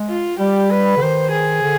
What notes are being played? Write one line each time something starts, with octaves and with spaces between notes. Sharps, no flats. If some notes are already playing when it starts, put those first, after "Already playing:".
Already playing: G#3
F4
G3 G4
B4
D3
D#3 C5
G#4
D3